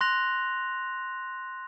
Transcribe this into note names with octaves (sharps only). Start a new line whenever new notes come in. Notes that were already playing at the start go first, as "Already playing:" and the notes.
C6 F#6 A#6 F7